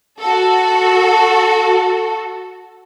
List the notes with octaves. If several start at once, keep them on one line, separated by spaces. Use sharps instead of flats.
F#4 A4